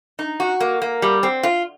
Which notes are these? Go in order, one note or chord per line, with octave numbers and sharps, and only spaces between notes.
D#4
F#4
A#3
A#3
G3
C4
F4